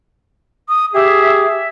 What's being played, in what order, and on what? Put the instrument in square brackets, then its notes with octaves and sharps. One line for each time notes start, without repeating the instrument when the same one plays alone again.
[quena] D#6
[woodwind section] G4 G#4 [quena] E5
[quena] E5